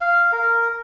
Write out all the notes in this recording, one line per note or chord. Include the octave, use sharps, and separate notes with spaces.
F5
A#4